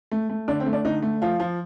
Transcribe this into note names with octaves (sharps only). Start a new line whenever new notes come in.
A3
A3
D3 D4
C4
A3
D4
D3 D#4
A3
F3 F4
F3